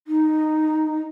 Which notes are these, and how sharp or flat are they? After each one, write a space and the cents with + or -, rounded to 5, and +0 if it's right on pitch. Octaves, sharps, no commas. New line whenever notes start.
D#4 -5